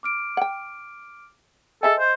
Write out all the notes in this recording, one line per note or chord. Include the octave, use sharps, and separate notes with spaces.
D6 F6 D7
F#5 G5
G#4 A4 D#5 E5 G#5
C5